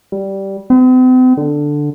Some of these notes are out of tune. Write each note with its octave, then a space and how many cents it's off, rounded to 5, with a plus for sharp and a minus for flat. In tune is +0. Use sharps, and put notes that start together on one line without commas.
G3 -10
C4 -45
D3 +5